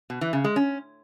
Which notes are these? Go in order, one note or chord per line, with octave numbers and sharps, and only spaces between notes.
B2
E3
C#3
G#3
C#4